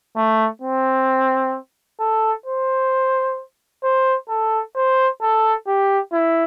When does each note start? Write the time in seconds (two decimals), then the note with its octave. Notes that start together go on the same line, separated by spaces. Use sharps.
0.16 A3
0.62 C4
2.00 A4
2.46 C5
3.84 C5
4.29 A4
4.76 C5
5.22 A4
5.68 G4
6.13 E4